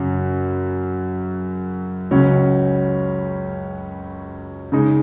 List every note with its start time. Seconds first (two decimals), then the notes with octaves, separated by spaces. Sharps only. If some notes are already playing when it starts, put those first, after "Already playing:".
Already playing: F#2 C#3 F#3
2.11 C#2 C#3 F#3 C#4
4.72 C#3 G#3 D#4